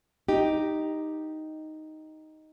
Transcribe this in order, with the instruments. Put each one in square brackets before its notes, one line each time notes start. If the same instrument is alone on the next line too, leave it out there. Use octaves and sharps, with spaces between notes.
[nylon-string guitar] D#4 G4